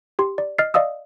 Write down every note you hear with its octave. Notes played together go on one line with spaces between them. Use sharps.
G4 C6
D5
D#5 F6 A6 C7
D5 D#5 F5 D#6 E6